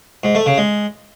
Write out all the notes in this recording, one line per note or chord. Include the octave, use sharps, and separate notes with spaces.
G#2
A3
C#3
G#3